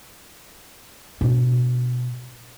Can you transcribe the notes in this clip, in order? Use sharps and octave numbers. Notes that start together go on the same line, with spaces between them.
B2 D4